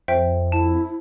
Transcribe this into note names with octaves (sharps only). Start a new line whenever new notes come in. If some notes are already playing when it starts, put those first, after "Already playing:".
F2 C5 E5 G5
E4 A5